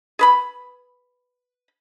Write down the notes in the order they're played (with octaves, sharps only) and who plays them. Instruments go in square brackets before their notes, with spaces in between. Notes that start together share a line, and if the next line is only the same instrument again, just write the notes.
[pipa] G#4 B4 B5